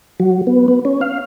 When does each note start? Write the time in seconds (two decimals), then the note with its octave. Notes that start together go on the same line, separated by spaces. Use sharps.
0.20 F#3
0.47 B3
0.68 B3
0.85 C#4
1.01 F5